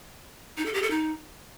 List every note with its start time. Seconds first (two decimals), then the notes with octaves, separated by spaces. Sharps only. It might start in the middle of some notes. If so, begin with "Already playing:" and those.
0.57 D#4
0.66 A4
0.74 G4
0.82 A4
0.90 D#4